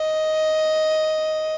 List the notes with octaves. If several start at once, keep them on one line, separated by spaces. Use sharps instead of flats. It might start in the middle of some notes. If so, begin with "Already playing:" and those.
Already playing: D#5